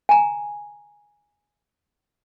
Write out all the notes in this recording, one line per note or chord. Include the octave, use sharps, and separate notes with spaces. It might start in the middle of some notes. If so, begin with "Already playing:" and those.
G#5 A#5